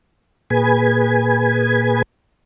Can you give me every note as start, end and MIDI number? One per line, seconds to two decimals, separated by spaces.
0.50 2.02 46
0.50 2.02 68
0.50 2.02 71
0.50 2.02 80